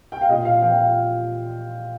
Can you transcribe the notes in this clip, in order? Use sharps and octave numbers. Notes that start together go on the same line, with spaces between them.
G5
F5
A#2 D#5
F5
F3 G5
F5